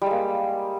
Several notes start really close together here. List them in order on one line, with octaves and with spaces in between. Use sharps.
G3 G#3 A#3